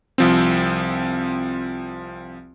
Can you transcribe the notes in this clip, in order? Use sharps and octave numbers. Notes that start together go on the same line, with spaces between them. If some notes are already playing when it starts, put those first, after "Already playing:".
C2 F3 C4